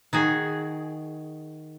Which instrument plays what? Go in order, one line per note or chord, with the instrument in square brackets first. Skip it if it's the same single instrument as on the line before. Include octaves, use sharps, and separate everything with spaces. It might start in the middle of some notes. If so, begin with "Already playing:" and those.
[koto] D#3 F#4 G#4